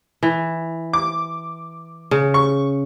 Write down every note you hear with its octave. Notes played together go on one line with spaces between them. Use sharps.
E3
D6
C#3
C#6